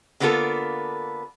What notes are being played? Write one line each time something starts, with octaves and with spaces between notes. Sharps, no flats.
D3 A#3 B3 F4 A4